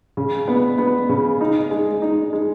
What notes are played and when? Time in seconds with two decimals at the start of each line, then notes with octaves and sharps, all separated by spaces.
0.17 C#3
0.48 B3
0.78 B3
1.09 C#3
1.41 D#4
1.71 G#3
2.02 D#4
2.33 G#3